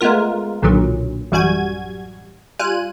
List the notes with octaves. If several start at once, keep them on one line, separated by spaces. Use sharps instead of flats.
G#3 A3 B3 F4 A#4
B1 A#2 D3 D#3 F#3
A1 F#2 G3 F#4 G#5 G#6
G3 F4 G#5 F#6 D#7